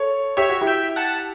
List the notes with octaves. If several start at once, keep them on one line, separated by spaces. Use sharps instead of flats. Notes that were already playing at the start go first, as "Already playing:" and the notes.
Already playing: A4 C#5
G4 C#5 E5
F#4
E4 G4
E5 G5
F#5 A5